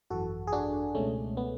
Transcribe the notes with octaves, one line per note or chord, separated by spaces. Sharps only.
G#1 F#2 E3 F#4 A4
G#4
D4 F#4
C#2 B2 G#3 A3 C#4
B3